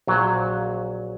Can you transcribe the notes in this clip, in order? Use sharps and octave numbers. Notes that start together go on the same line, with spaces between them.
A#1 A#2 F#3